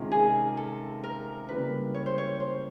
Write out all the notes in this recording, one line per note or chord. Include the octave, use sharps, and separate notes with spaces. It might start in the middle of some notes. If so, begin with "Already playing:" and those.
Already playing: C3 D#3 G#3 C#4 F4
G#4
A4
A#4
C#3 E3 G3 A#3 B4
C#5
C5
C#5
C5